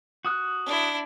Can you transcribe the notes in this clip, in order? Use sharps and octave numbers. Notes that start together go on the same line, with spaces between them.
F#4 D#6 F#6
D4 E4